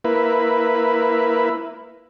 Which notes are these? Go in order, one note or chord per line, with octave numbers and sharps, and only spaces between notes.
A#3 E4 B4